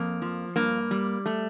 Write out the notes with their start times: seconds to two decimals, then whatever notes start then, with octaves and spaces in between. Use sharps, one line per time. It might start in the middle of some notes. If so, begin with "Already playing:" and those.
Already playing: F2 A#3
0.22 F3
0.56 G2 A#3
0.91 G3
1.26 A3